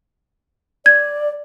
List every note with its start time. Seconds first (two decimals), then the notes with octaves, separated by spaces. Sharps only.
0.86 D5 G#6